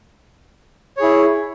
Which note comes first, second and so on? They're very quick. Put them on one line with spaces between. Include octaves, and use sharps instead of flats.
C#5 G#4 E4